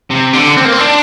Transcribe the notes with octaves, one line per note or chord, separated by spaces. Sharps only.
C3
D3
C4
A#3
C4
D4